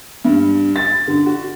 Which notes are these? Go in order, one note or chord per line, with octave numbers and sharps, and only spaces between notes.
G2
A6
D3
F#4